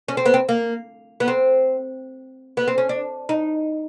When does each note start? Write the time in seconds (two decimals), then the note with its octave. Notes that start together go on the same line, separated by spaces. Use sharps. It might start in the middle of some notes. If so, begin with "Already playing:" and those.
0.08 C#4
0.17 C4
0.26 B3
0.34 C4
0.49 A#3
1.20 B3
1.28 C4
2.57 B3
2.68 C4
2.78 C#4
2.89 D4
3.29 D#4